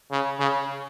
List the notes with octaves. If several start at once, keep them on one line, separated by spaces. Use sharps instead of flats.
C#3
C#3